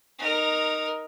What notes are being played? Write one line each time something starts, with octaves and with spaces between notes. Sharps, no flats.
D#4 A#4